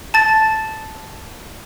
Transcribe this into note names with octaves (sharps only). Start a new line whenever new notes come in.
A5 A6